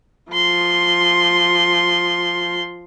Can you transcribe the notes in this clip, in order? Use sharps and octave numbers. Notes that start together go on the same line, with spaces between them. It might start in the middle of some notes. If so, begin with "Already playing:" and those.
F3 C6